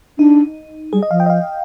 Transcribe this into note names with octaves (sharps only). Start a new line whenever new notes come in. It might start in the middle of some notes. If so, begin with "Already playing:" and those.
D4 D#4
G3 G#4
D#5
F3 F5
G5
D#5
F5